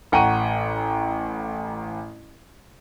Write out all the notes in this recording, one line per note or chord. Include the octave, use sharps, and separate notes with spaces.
A1 F#5 G5 A#5 C#6 D#7